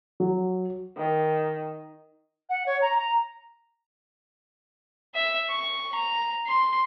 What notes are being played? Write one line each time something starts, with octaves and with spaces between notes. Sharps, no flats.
F#3
D#3
F#5
C#5
A#5
A#5
E5
C#6
A#5
C6